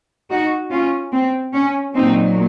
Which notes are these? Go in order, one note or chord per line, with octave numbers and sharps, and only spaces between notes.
D#4 F#4
C#4 F4
C4
C#4
A#2 F#3 A#3 C4 D#4